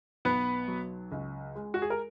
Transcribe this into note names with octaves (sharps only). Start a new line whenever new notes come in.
B1 B3 B4
F#3
C#2
G#3
F#4
G#4
A#4